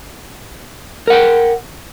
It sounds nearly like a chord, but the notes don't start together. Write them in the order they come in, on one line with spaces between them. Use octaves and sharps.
A#4 F#5 G5